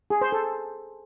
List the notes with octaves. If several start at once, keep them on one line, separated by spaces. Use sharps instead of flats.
G#4
C5
A4